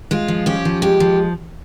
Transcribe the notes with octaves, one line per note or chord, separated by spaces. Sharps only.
G#3 F4
F3
C#4 G4
F3
G#3 G4
F3